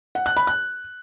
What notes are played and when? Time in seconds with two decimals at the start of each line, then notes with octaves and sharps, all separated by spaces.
0.15 F#5
0.26 F#6
0.37 B5
0.47 F#6